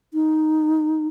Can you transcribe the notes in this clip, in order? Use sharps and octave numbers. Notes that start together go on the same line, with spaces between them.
D#4